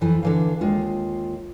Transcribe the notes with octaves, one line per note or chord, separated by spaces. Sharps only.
F2 E3 F3
D3 E3 F5
D#2 G#3 F4